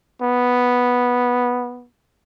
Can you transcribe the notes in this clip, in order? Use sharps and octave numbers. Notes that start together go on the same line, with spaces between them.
B3